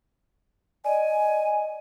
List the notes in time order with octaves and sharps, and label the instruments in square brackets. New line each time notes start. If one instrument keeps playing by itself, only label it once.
[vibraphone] D5 D#5 [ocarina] G#5